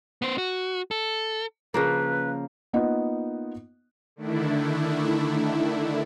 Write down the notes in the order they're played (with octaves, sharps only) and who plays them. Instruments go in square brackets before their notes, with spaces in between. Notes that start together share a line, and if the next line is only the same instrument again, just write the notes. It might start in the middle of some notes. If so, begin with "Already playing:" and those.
[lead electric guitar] B3 C5
F#4
A4
[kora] C#3 F3 A#3 [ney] B4
[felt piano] A#3 B3 D#4 F4 D#5 F#5
[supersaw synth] D3 D#3 A3 D4 E4